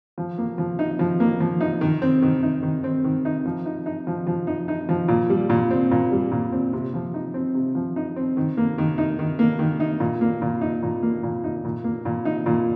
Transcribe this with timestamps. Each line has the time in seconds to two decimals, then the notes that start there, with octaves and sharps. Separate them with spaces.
0.18 F3
0.38 A#3
0.58 F3
0.79 D#4
0.99 F3
1.20 A#3
1.40 F3
1.61 D#4
1.81 D#3
2.02 C4
2.22 D#3
2.43 D#4
2.63 D#3
2.84 C4
3.04 D#3
3.25 D#4
3.45 F3
3.66 D#4
3.86 D#4
4.07 F3
4.27 F3
4.47 D#4
4.68 D#4
4.89 F3
5.08 A#2
5.30 G3
5.50 A#2
5.70 C4
5.91 A#2
6.12 G3
6.31 A#2
6.52 C4
6.73 C3
6.94 F3
7.14 D#4
7.34 C4
7.54 C3
7.75 F3
7.96 D#4
8.16 C4
8.37 D#3
8.57 A#3
8.78 D#3
8.98 D#4
9.19 D#3
9.39 A#3
9.59 D#3
9.80 D#4
10.00 A#2
10.21 A#3
10.42 A#2
10.61 D#4
10.83 A#2
11.03 A#3
11.23 A#2
11.44 D#4
11.65 A#2
11.84 A#3
12.05 A#2
12.25 D#4
12.46 A#2